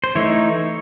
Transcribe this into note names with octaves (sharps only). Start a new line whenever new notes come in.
C5
E3 A3 D#4 C#5